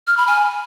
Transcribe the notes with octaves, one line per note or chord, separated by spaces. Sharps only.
F6
B5
G#5